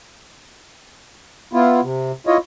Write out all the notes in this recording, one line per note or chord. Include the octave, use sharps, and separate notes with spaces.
B3 E4 F4
C3
E4 F4 C#5 D#5